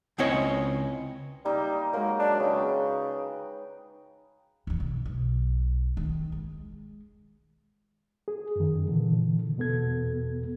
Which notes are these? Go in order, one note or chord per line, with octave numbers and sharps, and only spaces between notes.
C#2 C#3 C4 E4 C#5 D#5
G3 A#3 D#4
F#3 G#3 A#3
D4
C#3 B4 G5
F#1 E3
E1
B1
D#3
G#3
G#4
F#2 D#3
A#2 D3 E3
E2 B2 B3 A4 G#6